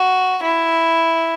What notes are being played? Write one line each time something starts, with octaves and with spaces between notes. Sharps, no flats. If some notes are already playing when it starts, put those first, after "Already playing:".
Already playing: F#4
E4